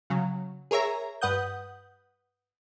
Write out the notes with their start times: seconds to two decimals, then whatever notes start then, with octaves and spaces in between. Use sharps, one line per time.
0.10 C#3 F#3
0.71 G#4 A#4 C#5 E5 A#5
1.21 G2 B4 F#5 D#6 G6